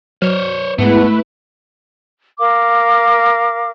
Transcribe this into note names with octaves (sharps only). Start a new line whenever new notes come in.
F#3 C5 C#5 F6
G#2 G#3 A3 B3 E4 B4
A#4 F5 D6